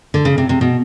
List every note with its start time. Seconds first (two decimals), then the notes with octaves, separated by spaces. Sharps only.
0.14 D3
0.25 C#3
0.38 C3
0.49 C3
0.61 B2